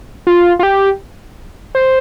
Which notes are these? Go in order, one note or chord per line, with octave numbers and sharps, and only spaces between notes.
F4
F4
G4
C5